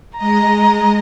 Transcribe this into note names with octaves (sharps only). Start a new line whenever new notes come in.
G#3 D#5 A#5